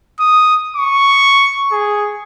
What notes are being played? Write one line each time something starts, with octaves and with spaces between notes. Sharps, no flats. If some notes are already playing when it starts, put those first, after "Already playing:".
D#6
C#6
G#4